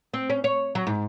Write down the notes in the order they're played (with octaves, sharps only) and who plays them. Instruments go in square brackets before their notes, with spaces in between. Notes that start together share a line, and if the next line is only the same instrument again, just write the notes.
[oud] C4
C#4
C#5
F#3
G#2